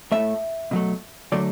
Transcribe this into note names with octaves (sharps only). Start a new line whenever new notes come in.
A2 A3 E5
B2 F#3 A3
D3 F#3 A3 D5